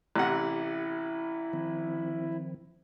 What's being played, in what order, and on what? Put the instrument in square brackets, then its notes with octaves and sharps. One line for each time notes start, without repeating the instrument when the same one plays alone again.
[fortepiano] A1 C3 F#5 [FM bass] E4
[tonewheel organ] D#3 F3 C4